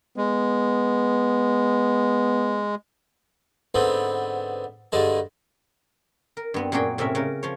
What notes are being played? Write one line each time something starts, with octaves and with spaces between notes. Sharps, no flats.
G#3 B3
G#2 D3 B3 C4
G2 D3 G#3 A5
A#4
G2 B3 C4
F#2 A#2 F#4 G#4 G5
A2 C3 C#4 A#4 E5
C#3 A#4
F3 C#5